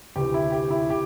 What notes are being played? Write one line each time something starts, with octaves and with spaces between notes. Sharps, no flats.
D2 C3 E3 G4
E4
G4
E4
G4